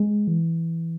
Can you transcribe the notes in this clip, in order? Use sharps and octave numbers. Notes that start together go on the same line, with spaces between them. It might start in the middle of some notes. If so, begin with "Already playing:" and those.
Already playing: G#3
E3